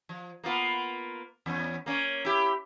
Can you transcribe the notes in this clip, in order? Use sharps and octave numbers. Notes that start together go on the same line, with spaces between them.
F3
A#3 B3 F4
E2 C#4
A#3 C#4
E4 G4